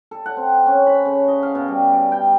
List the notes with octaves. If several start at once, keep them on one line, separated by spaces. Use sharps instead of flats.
A4
F#5
C4
C#4
B5
C#3
D#5
F5
B2
G3
D5
G5